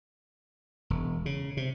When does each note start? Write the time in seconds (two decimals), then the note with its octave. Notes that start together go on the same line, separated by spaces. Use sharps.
0.90 E1
1.26 C#3
1.57 C3